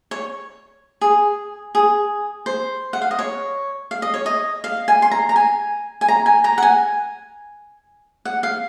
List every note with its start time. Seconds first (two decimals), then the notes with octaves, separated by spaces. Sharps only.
0.11 C#5
1.01 G#4
1.75 G#4
2.46 C5
2.93 F#5
3.02 F5
3.11 D#5
3.19 C#5
3.91 F5
4.02 D#5
4.14 C#5
4.26 D#5
4.64 F5
4.88 G#5
5.02 C6
5.11 A#5
5.29 A#5
5.36 G#5
6.01 G#5
6.08 A#5
6.26 G#5
6.44 A#5
6.58 F#5
6.63 G#5
8.25 F#5
8.43 F5